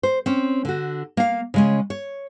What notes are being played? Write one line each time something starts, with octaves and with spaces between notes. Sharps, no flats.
C5
C4 C#4
D3 F#4
A#3 F5
C#3 G#3 C#4
C#5